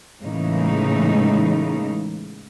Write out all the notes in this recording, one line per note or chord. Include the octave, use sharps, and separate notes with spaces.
A2 C#3 E3 G#3 A#3 D#4